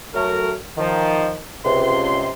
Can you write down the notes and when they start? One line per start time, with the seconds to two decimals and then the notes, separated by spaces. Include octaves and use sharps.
0.15 F#3 A3 A#4
0.77 D#3 F3
1.65 C#2 C3 C6